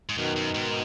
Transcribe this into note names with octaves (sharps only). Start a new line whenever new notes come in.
G#2
F#2 B2 D#3
F#2
G#2